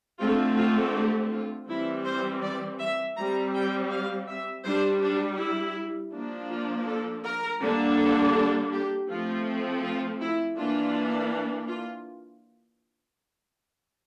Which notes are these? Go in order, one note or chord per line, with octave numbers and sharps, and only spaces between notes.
D3 A3 C4 F4
F4
G4
F4
E3 G3 C4 E4
C5
D5
E5
G3 C4 A#5
G5
F5
E5
G3 D4 C5
D4
E4
F3 A#3 D4
F4
A4
A#4
D3 G3 A#3 D4
A4
A4
G4
F3 A3 C4 F4
F4
E4
E3 A#3 D4 F4
F4